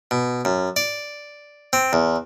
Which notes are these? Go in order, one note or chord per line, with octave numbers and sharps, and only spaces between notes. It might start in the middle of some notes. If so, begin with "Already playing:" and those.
B2
F#2
D5
C4
E2